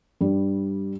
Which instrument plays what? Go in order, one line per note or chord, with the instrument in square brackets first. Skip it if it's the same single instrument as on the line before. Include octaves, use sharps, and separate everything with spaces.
[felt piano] G2 G3